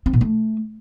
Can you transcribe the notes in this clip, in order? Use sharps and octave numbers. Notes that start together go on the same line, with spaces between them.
C4
A#2
A3